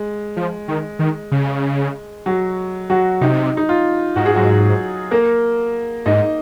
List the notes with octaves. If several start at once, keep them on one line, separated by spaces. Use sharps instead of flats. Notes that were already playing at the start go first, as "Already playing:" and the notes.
Already playing: G#3
F3
D#3
D#3
C#3
F#3 F#4
F#3 F#4
C3 D#4
D#4
F4
G#2 F#4
G#4
F#3 F#4
A#3 A#4
G#2 D#4 D#5